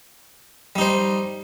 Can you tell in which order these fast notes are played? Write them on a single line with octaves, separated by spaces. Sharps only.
G3 D#4 C5